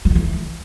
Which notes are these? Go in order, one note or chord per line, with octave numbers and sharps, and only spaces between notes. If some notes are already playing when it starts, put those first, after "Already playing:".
F#3
D#3
E3